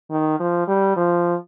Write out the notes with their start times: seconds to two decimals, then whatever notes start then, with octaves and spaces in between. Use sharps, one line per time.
0.11 D#3
0.40 F3
0.68 G3
0.97 F3